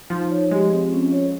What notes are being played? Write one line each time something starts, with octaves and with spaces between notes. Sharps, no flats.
F3 D#4
C#5
G#3 G4
C4
C#4
C#5